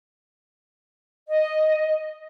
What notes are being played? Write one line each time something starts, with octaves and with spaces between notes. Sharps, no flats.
D#5